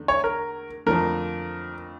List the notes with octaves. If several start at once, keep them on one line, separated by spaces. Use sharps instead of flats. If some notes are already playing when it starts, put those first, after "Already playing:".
Already playing: E2 D3 A3
C#5
A#4
F2 D3 F3 A3 A#4